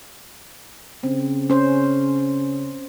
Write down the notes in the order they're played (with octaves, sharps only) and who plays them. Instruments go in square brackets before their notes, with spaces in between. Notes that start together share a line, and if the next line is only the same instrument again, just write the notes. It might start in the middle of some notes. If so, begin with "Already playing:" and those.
[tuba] C#3 [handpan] C4
[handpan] C#4 C5